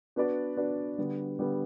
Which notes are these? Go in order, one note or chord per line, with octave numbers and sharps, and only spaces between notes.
B3 D4 F#4 B4 D5
B3 D4 F#4 B4 D5
D3 G3 B3
D3 G3 B3